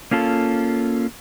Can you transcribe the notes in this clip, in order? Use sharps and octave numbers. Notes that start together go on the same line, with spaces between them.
A#3 C#4 F4 A4